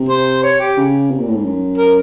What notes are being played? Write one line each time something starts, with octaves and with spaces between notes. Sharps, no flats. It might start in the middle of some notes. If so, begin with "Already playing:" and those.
Already playing: C3
C5
C#5
G4
C#3
C3
A#2
A2
G#2
F#2
A#4